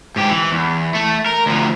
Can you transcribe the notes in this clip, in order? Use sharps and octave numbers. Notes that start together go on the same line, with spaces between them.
G#2 G4
E3
E2
A3
A#4
D2 F3